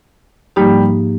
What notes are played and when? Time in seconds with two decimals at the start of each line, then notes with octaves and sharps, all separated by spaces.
0.56 G#2 F3 G3 A#3 D#4 G4